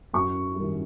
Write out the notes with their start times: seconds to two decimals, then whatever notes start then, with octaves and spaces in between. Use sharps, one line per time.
0.13 F#2 C#6
0.56 D#3 G3